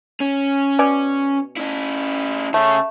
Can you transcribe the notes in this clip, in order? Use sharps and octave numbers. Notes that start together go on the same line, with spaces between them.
C#4
B2 D5 G#5
C#4 E4
C#3 A3 C#4